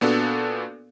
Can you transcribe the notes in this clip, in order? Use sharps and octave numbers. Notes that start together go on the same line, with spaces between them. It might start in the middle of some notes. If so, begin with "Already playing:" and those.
A#2 B3 D4 F#4 A4